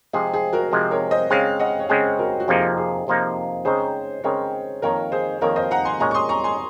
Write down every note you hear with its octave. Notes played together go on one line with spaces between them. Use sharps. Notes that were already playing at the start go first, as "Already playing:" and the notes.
C3 F3 G#3 C4 G#4
G#4
F#4 A#4
C3 F3 G#3 C4
A#4 C#5
C5 D#5
C#3 G#3 C4 C#5 F5
D#5 F#5
C#5
C#3 G#3 C4 G#4 C5
F#4 A#4
F#4
F2 C3 F3 A#3 D#4 G#4
G#4
F2 C3 F3 A#3 D#4
C#3 G#3 C4 D#4 G#4 C5
C#3 G#3 C4 D#4 A#4 C#5
F2 D#3 A#3 D#4 A#4 C#5
G#4 C5
F2 D#3 A#3 D#4 A#4 C#5
C5 D#5
F#5 A#5
G#5 C6
A#2 G#3 C#4 A#5 C#6
C#6
C6 D#6
A#5 C#6
G#5 C6